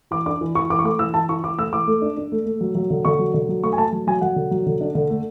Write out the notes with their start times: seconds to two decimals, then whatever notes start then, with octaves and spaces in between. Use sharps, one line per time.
0.11 E3 D6
0.26 D4 D6
0.41 E3
0.55 E3 C#6
0.70 E3 D6
0.79 C#6
0.84 A3 D6
0.99 E3 E6
1.14 E3 A5
1.29 E3 C#6
1.43 E3 D6
1.58 A3 E6
1.72 E3 D6
1.87 A3
2.02 D4
2.17 D4
2.32 A3
2.45 A3
2.61 F#3
2.75 F#3
2.90 D3
3.05 D3 C#6
3.19 F#3
3.34 D3
3.49 F#3
3.63 A3 C#6
3.73 G#5
3.78 A3 A5
3.92 F#3
4.07 F#3 G#5
4.21 F#3 F#5
4.36 D3
4.51 F#3
4.66 D3
4.80 D4
4.95 D3
5.10 A3